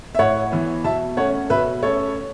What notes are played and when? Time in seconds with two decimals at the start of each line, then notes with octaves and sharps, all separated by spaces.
0.15 E5
0.19 A2 C#5 F#5
0.52 E3 B3
0.84 B2 E5 A5
1.17 A3 C#4 C#5 F#5
1.50 B2 B4 E5
1.82 A3 C#4 A4 C#5